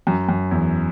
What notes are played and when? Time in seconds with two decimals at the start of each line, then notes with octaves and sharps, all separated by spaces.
0.07 F#2
0.29 F#2
0.51 E2